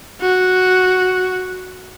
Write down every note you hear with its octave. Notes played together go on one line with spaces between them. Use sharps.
F#4